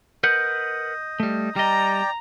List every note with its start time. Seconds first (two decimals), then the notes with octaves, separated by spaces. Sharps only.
0.24 A#4 B4 D#5 F#5 G6
1.20 G3 A3
1.56 G3 D5 D#5 G5 A#5